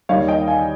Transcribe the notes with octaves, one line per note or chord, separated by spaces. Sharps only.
D#2 D#3 G3 C#5 F5
D#5 G5
F5 G#5